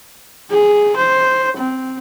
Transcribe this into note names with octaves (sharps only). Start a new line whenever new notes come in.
G#4
C5
C4